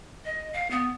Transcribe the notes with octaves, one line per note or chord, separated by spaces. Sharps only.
D#5
F5
B3